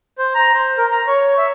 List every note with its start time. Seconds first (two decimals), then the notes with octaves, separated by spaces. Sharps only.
0.18 C5
0.35 A#5
0.53 C5
0.78 A#4
0.91 A#5
1.07 C#5
1.38 E5